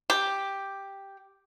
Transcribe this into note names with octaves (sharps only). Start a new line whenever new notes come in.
G4